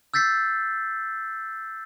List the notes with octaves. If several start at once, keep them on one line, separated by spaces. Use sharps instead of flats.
E6 G6 A6 B6 C7